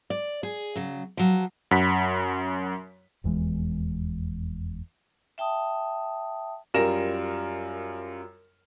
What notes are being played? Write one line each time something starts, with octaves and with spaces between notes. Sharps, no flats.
D5
G#4
C#3 F#3
F3 F#3
F#2 F#5 B5 B6
F1 E2 E3 G#3
E5 G5 A5 D#6
F#2 G3 F4 A#4 A#6 E7